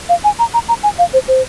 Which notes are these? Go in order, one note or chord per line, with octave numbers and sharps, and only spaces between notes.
F5
G#5
A#5
A#5
A#5
G#5
F5
C5
C5